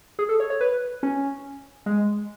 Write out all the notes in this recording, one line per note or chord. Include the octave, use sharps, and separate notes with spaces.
G#4
A4
C#5
C#5
B4
C#4
G#3